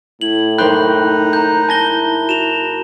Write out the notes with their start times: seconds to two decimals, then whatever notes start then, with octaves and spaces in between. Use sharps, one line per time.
0.21 A2 E4 F#7
0.59 F#1 D#4 C5 G5 B5 F#6 G6
1.33 A#5 G6
1.69 E4 G#5 A5 A#6 G7
2.29 F#4 E7 F7